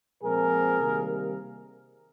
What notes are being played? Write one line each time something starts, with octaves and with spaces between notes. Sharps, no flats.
A#2 F3 G#3 C4 G#4 A#4
C3 D#3 G3 A#3